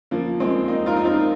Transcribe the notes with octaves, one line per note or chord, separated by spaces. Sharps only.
F3 A#3
G#3 C4
A#3 D#4
F4 A#4
D#4
C4 F4